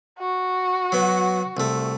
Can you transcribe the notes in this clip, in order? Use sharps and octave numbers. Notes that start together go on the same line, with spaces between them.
F#4
F#3 B3
C2 A3